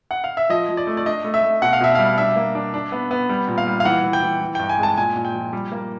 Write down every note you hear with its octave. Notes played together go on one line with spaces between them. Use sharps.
F#5
F5
E5
F3 D#5
F3
D5
A3
D5
D4 D#5
A3
E5
A3
B2 F#5
F5
B2 E5
G3 F5
D4 E5
A#3
D4
D4
B3
B3
G3
A#2
F5
G3
F5
E3 F#5
E3
G5
E3
E3
G2 G5
G#5
G#3 A5
A#2 G#5
A#2
G5
F3
G3
A#3